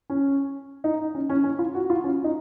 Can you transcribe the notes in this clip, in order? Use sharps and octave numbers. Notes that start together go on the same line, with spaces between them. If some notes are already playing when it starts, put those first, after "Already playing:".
C#4
D#4
C#4
C#4
C#4
F4
F#4
F4
C#4
D#4